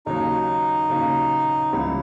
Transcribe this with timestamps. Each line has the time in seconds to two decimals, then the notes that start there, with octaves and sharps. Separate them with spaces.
0.06 D#2 C#3 F#3 D#4
0.89 D#2 C#3 F#3
1.73 C#2 C#3 E3 G3 E4